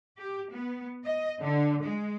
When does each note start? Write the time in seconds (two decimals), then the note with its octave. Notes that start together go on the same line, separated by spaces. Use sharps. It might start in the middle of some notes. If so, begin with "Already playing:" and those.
0.18 G4
0.53 B3
1.05 D#5
1.41 D3
1.82 G#3